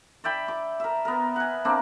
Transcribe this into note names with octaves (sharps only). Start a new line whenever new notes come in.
D5 E5 G5 B5
D6
A#4 E5
B3 A#4
F#5 G#5
A#3 C4 D4